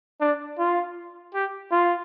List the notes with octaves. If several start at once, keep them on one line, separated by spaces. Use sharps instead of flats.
D4
F4
G4
F4